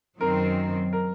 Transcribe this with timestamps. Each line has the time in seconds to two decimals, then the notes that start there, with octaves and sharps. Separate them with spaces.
0.20 F#2 D#3 F#3 C4 A#4
0.93 A#4